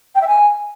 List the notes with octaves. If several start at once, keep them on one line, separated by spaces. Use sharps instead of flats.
G5
E5
G#5